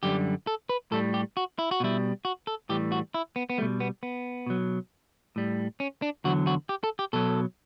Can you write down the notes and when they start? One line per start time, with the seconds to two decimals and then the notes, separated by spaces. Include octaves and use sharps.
0.03 F#2 D3 G3 G4
0.47 A4
0.69 B4
0.92 A2 G3 A4
1.14 G4
1.37 F#4
1.59 E4
1.71 F#4
1.80 B2 G3 E4
2.25 F#4
2.47 A4
2.69 A2 E3 G3 G4
2.92 F#4
3.14 E4
3.36 B3
3.50 B3
3.58 B2 G3 A3
3.80 B3
4.03 B3
4.47 B2 F#3
5.36 A2 G3
5.80 C#4
6.02 D4
6.24 E2 D3 F#3 F#4
6.47 F#4
6.69 G4
6.84 A4
6.99 G4
7.13 B2 F#3 A4